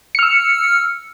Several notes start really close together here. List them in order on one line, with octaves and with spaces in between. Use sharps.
C#7 F6 E6